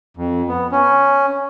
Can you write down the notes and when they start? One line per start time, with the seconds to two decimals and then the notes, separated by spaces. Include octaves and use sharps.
0.17 F2
0.48 B3
0.72 C#4